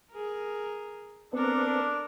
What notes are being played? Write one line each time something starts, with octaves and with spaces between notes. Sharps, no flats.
G#4 A#4
B3 C4 D4 A4 A#4